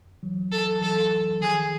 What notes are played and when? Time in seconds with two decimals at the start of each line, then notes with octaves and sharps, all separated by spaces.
0.23 E3 F#3
0.52 A4
0.82 E3 F#3 A4
1.41 D#3 F3 G#4